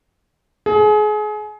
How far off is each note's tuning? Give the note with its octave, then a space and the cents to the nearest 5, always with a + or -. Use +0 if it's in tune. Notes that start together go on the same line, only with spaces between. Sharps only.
G#4 +30